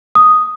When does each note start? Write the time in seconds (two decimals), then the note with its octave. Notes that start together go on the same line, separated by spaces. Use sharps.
0.15 D#6